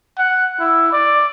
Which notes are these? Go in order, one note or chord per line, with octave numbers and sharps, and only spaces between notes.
F#5
E4
D5